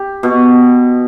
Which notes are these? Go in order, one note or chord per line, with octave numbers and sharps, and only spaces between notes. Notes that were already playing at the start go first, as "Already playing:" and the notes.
Already playing: G4
B2